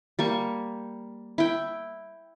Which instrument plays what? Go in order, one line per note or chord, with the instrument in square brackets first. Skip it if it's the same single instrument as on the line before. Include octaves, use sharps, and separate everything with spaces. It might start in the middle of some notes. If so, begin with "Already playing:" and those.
[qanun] G3 A#3 C#6
E4 G5